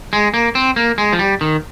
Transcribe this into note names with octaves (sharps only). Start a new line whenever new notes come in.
G#3
A#3
C4
A#3
G#3
F3
G3
D#3